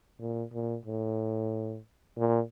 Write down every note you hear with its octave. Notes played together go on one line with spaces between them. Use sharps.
A#2
A#2
A2
A#2